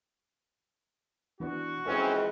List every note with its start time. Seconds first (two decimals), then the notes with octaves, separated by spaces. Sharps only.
1.40 E3 B3 D4 F#4
1.86 F2 E3 G#3 C4 C#4 A4 B4 C5